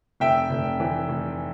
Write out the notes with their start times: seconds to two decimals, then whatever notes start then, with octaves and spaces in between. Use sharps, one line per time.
0.20 F1 E5 G5
0.50 F1
0.80 E3
1.09 F1